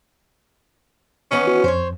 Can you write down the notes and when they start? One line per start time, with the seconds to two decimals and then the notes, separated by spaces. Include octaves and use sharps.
1.31 D#3 E3 B3 C#4
1.47 F#4
1.64 F2 C5 C#5